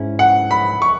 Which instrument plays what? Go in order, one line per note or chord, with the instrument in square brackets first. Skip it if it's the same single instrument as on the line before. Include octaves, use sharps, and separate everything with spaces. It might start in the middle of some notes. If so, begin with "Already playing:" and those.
Already playing: [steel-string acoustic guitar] G#2 C#4 E4
[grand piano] F#5
B5
C#6